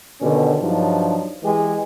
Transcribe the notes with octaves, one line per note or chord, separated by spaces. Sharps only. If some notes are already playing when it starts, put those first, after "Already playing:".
B2 D3 D#3 C#4 G4
G2 F3 F#3 D4 D#4
E3 G#3 G4 G#4